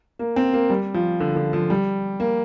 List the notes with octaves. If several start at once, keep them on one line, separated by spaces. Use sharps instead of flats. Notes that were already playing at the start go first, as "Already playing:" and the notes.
A#3
C4
A#3
G3
F3
D3
D3
F3
G3
A#3